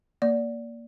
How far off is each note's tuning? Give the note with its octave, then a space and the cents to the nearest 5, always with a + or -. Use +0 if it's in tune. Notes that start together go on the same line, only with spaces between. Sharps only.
A#3 +0 D5 -15